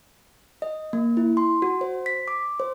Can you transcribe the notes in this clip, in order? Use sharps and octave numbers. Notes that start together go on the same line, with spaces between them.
D#5
A#3
E4
C6
F#4
C5
B6
D6
C5